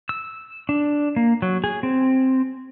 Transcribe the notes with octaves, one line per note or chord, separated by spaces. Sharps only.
E6
D4
A#3
F#3
G#4
C4